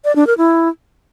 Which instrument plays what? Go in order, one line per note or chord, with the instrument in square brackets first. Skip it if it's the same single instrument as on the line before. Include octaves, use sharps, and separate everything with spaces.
[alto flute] D5
D4
A#4
E4